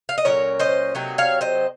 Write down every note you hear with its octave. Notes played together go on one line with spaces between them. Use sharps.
F5
D#5
A#2 F#3 C#4 A#4 C#5
C5 D#5
C3 F#3 A#3 D#4
C#5 F5
C5 D#5